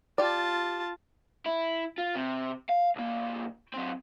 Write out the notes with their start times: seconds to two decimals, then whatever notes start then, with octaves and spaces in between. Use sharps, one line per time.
0.18 F4 G4 D5 A5
1.46 E4
1.98 F4
2.16 C3
2.69 F5
2.96 B1 A#3
3.74 F#3 C4